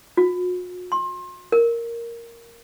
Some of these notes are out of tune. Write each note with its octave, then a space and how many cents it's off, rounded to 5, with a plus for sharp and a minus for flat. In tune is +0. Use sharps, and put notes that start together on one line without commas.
F#4 -45
C6 +30
A#4 +0